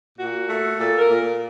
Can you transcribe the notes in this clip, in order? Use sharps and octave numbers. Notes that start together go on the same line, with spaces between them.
A#2 F#4
A3
A#2 A4
A#4
A#2